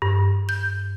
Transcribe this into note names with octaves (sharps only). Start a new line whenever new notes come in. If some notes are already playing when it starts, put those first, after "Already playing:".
G2
G6